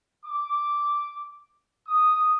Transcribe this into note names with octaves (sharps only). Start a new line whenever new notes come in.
D6
D#6